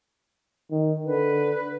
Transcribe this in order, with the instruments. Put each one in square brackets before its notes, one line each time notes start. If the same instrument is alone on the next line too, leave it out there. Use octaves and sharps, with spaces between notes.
[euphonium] D#3
[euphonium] D3 [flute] B4